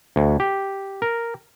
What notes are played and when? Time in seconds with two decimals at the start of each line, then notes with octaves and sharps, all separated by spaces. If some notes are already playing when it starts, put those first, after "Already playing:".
0.16 D2
0.40 G4
1.02 A#4